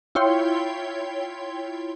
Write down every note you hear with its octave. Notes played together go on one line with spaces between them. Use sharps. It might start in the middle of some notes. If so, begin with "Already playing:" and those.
E4 F4 C#5 G5 C6